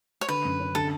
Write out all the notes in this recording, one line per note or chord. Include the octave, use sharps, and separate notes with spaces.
C#5
D3 B4
F#2
C#4
D3 A4